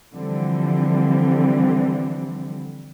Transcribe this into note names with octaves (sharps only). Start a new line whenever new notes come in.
D3 E3 F3 G3 C4